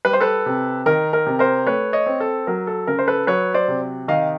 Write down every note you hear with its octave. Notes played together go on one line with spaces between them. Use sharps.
G3 B4
C5
A4 B4
C3
D#3 A#4
A#4
C3
A#4 C5
A3 B4 C#5
C#5 D#5
C4
A4
F#3 A#4
A4
C#3 A#4
C5
A4 B4
F#3 B4 C#5
C5 D5
C3
D#3 D#5 F5